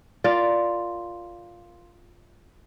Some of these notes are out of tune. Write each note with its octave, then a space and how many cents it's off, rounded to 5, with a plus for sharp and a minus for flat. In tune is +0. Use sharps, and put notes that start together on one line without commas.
F4 +0 A#4 +0 D5 +0